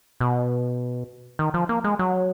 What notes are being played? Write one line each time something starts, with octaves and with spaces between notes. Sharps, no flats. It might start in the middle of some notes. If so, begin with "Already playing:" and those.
B2
D#3
F3
A#3
G#3
F#3